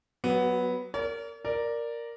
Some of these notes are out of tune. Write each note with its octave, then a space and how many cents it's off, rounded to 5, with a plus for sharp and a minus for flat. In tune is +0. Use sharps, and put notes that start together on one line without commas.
F#3 +0 B3 +0 F#4 +45
A#4 -10 D5 -45
A#4 +0 D5 +0